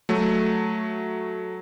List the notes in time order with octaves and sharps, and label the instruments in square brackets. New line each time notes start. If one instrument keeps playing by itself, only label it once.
[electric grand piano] F#3 A3